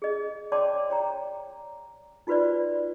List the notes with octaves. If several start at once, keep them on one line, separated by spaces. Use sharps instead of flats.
G#4 D#5
C#5 D5 G5 A5 C6 D6
C#5 G5 A#5
D#4 F4 F#4 B4 C5 D5